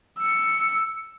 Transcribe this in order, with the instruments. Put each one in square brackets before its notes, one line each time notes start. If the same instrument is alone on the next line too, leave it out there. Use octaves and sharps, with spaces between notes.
[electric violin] E6 C#7